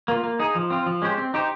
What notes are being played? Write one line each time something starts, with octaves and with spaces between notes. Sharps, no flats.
A#3 F4
A#3
D#4 G#4
F3
C4 F4
F3
G#3 C#4 G4 C5
C4
D#4 G4 C5